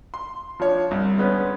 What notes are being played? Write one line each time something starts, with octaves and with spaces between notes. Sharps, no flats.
C6
F3 D4 C#5
C2
D3 G#3 B3 C#4